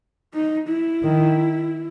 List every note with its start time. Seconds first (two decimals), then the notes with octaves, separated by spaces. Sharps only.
0.34 D#4
0.69 E4
1.03 D#3